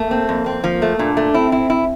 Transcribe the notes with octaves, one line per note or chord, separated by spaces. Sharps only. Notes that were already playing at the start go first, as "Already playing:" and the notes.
Already playing: A3 A#3
C4
F2
C4
F3 A#3
A3
A#2 D4
A3
C4 E4
E4
E4